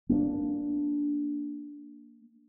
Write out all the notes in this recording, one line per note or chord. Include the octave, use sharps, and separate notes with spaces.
A#3 B3 D4